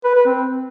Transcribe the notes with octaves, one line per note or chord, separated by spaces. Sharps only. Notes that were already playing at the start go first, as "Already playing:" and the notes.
B4
B4
C4